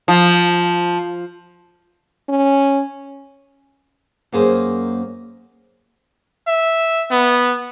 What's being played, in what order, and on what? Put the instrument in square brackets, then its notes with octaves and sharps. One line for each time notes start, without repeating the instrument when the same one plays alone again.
[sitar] F3
[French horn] C#4
[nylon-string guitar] F#2 A#3 G#4 C5
[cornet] E5
B3